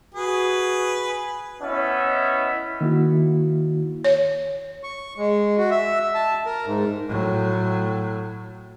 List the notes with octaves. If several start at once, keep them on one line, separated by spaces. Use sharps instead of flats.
F#4 G#4 B4
B3 C#4 E4 D#5 E5
D#3 A#3 E4 F#4
C#5
C#6
G#3
F#4
E5
A5
A#4
G#2
A2 F#3